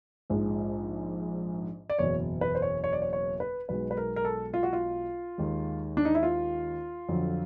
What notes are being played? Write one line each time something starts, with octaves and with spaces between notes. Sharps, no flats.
A#1 G#2 F3 G#3
D5
F#1 E2 B2 C#5
B4
C5
C#5
C#5
D5
C#5
C#5
B4
B1 B2 G#3 B4
B4
A#4
A#4
A4
F4
F#4
F4
D#2 D#3 G#3
D4
D#4
E4
F4
F2 D3 F#3